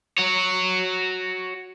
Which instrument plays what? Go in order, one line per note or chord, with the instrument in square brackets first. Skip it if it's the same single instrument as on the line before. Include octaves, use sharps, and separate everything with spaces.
[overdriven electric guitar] F#4 C#5